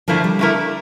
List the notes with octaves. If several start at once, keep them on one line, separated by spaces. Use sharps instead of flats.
D3 F3 A3 E4 A#4
G3
D3 A3 E4 A#4